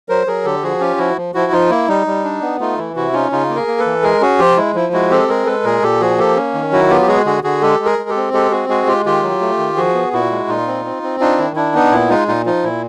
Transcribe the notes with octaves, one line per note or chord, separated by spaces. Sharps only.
F#3 A#4 C5
F#3 G#4 A#4
D3 G4 A4
F3 F#4 G#4
C#4 F4 G4
F3 E4 F#4
F3
F3 E4 F#4
F3 D#4 F4
A#3 E4
G3 D#4
G3
D4
B3
A3 D#4 F4
E3 E4
C3 E4 F#4
C#4 D#4 F4
C#3 D#4 F4
A#3
G#4 A#4
A#3
A4 B4
E3
G#3 G#4 A#4
C#4 F#4 G#4
F3 F4 G4
G#3 E4
F3 E4
G#3 E4 F#4
C4 G4 A4
G#3 G#4 A#4
G#3 A4 B4
A#2 G#4 A#4
A#2 G4 A4
F3 F#4 G#4
A#3 G4 A4
C#4
D#3
F#3 E4 F#4
B3 F4 G4
G4
G#3 F#4 G#4
D3 F#4 G#4
D3 F#4 G#4
G#3 G4 A4
G#3
G#4 A#4
G#3
G4 A4
C4
G#3 G4 A4
C4 F#4 G#4
G#3 F#4 G#4
G#3 F4 G4
D#3 F4 G4
F#3
A3
D#3
F3 F#4 G#4
B3
A#2 E4 F#4
G#3
A#2 D#4 F4
C4
C4
C4
D4 D#4 F4
D#3 E4
D4 E4
B3 D#4
A#2 E4
G#3 D#4 F4
A#2 D#4 F4
F3 D#4 F4
A#2 E4